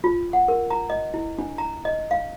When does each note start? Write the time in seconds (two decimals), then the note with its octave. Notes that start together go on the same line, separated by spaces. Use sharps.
0.04 F4
0.33 F#5
0.48 A#4
0.70 A#5
0.90 D#5
1.14 E4
1.39 D4
1.58 A#5
1.85 D#5
2.11 F5